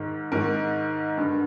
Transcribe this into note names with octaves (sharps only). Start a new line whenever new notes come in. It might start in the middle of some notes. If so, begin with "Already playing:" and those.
Already playing: G#2 D#3 A#4
G#2 D#3 A#4
G2 D3